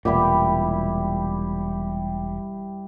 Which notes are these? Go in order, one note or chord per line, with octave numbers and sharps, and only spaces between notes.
E1 A#2 G3 E4 G4